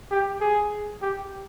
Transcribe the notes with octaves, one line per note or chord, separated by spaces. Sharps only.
G4
G#4
G4